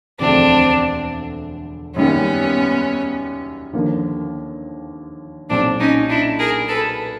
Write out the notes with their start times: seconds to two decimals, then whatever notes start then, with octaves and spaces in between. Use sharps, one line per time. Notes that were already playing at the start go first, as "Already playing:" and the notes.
0.19 E1 D2 D3 F3 A3 C4 D4
1.96 F#2 D#3 G3 A#3 B3 C#4
3.73 D#2 D3 F3 A#3
5.50 B1 A#2 F#3 C4 D4
5.80 C#4 D#4
6.09 D4 E4
6.39 G#4 A#4
6.68 A4 B4